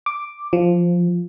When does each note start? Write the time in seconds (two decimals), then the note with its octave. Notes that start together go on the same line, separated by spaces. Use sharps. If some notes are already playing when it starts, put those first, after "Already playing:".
0.06 D6
0.53 F3